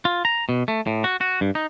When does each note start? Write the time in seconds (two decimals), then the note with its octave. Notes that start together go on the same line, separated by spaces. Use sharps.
0.05 F4
0.25 A#5
0.49 B2
0.68 A3
0.87 A2
1.04 F#4
1.21 F#4
1.41 G2
1.55 D#4